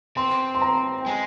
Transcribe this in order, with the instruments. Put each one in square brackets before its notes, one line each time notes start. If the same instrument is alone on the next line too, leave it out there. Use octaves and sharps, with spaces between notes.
[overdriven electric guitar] C4 [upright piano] C6
[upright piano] C6
A#5
G5
[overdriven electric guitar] G#3 [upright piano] G#5